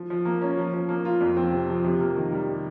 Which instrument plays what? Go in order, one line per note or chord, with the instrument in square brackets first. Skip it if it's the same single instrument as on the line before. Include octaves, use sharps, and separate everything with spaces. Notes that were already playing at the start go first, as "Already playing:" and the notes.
Already playing: [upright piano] F3
F3
A#3
C#4
F3
F3
A#3
F4
F2
C4
C3
F3
C3
A#3
D#3
G3